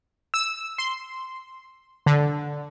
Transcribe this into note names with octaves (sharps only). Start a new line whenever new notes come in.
E6
C6
D3